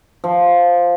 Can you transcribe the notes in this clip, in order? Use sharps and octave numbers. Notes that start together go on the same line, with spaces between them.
F3